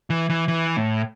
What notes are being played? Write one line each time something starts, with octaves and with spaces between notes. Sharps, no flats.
E3
E3
E3
A2